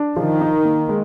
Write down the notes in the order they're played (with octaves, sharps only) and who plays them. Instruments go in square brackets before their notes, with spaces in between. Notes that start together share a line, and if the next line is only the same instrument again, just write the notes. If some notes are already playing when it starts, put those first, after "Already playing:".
Already playing: [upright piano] D4
[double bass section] D#3 [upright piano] F3
[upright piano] D#4
A#3
G#3